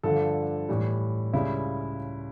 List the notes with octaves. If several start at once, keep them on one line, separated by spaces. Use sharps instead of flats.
G2 D3 F3 A4
A2 E3 G3
C#2 C#3 G3 E4